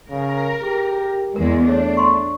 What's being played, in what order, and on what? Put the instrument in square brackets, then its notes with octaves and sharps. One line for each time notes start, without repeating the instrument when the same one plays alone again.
[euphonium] C#3 [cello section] A#4
[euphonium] G4 [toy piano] G#4
[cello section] E2 G#3 [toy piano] A#4
[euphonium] A3 [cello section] D4 [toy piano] G#4 C#5
[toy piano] C6 C#6